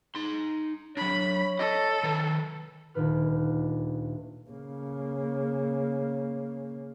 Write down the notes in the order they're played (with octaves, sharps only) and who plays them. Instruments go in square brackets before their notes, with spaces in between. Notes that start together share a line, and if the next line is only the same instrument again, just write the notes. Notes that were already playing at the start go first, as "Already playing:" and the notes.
[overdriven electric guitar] D#4 C6
[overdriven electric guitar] F#3 D4 [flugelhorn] C#5 [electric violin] B5
[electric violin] A4 [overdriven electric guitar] D#5
[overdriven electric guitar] D#3 B4
[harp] D#1 D2 A#2 D#3 B4 F6
[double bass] C#3 A#3